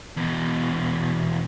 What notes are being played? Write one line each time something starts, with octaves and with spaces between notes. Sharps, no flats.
E2 B2